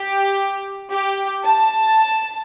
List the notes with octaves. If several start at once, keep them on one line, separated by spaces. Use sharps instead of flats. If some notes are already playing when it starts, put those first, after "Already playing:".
Already playing: G4
G4
A5